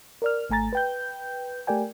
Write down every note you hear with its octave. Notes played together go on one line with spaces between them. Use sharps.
A#4 D5 F6
G#1 A3 G#5 A#5 A6
B4 G5 G6
A3 G4 A#4 D5 G5 G#5